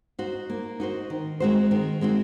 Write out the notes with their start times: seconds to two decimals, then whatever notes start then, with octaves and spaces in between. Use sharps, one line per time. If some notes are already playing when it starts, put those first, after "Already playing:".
0.19 D#4 F#4 C5
0.50 A#3
0.80 D#4 F#4 C5
1.10 D#3
1.40 G#3 C4 F#4 C5
1.71 D#3
2.01 G#3 C4 F#4 C5